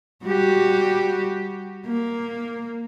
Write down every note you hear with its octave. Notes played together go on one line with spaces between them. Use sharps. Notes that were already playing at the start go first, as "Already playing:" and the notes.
G3 F#4 G4
A#3